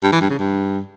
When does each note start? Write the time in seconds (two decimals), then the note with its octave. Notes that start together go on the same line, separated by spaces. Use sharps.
0.03 G2
0.12 E3
0.21 G2
0.30 C#3
0.39 G2